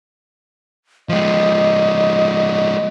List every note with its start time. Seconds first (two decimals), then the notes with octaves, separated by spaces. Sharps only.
1.09 F3 G#3 D#5